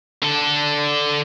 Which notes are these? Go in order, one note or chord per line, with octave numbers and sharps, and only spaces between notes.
D3 A4